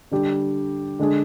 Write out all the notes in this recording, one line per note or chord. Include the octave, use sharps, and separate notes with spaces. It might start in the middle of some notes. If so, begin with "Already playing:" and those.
D3 G3 D4 G4
D3 G#3 D4 G#4